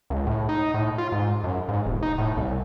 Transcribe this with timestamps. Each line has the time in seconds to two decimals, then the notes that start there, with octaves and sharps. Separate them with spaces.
0.10 C#2
0.27 A2
0.49 D#4
0.74 A2
0.98 F4
1.12 G#2
1.44 F#2
1.69 G#2
1.86 E1
2.03 D#4
2.18 A2
2.37 C2